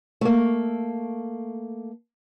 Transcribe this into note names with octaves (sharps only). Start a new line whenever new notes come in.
A3 A#3